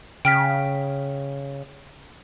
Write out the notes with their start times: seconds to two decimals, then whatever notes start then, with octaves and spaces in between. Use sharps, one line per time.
0.25 C#3 G5 F6 B6